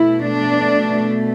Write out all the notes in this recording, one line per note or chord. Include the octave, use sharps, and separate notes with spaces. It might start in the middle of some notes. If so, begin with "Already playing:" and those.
Already playing: B2 A3 E4
D4